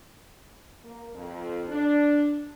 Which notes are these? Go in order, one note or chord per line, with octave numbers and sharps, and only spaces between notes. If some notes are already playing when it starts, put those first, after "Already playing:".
A#3
F2
D4